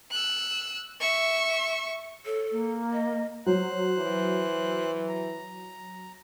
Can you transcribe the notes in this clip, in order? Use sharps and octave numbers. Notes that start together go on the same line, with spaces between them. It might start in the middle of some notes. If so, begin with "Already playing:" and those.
E6 F#6
E5 C#6
A4 C#5
A#3
D#5
F#3 C5 F#6
E3
A#5